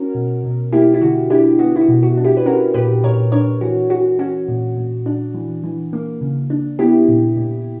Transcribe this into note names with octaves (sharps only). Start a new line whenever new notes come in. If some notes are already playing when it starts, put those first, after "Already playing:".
Already playing: C#4 F#4 A#4
B2
B2
A#3 E4 G4
E4
D3 F#4
D4 E4 G4
B3 F#4
E4
F#4
B2
F#4
D4
E4 G4
B4
C#4 F#4 A#4
A#2 G4 B4
A#2 A#4 C#5
D4 A#4 C#5
E3 F#4
E3 F#4
C#4 F#4
A#2
A#2
D4
E3
E3
A#3
C#3
D4
B3 E4 G4
A#2
A#2